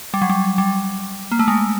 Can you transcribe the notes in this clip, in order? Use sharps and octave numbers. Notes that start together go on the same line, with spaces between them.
G3
F#3
G3
G3
A#3
A3
G#3